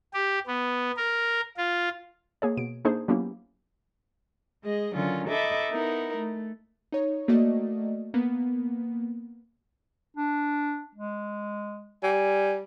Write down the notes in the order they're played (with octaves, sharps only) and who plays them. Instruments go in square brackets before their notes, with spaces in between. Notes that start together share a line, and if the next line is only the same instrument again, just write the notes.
[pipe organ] G4
B3
A#4
F4
[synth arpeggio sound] A#3 G#4 C#5
B2 D7
A#3 D4 D#4 G#4 C5
F#3 A#3 B3 C#4 E4 G4
[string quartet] G#3 G#4 D#5
D3 D#3 F#3 C#4 F4
D#4 A4 D#5 E5 B5 D6
B3 D#4 E4 A#4
A3
[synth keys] D#4 C#5
A3 A#3 F#4 D5 D#5
A#3 B3
[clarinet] D4
G#3
[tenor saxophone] G3 [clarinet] G#5